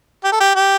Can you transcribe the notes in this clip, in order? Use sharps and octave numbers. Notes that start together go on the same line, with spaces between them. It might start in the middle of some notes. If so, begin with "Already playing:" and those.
G4
A4
G4
G4